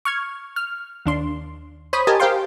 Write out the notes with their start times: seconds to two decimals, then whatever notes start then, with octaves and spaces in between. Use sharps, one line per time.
0.05 C#6 F6 G#6
0.56 F6
1.06 D#2 D4 C6
1.93 C5 C#5 B5 D#6
2.07 G4 A#4 D#5 G#5 A5
2.20 G4 A#4 C5 F5 G5 C6